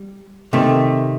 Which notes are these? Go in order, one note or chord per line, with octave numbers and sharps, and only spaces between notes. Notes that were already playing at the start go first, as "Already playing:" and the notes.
Already playing: G3
C3 D#3 A3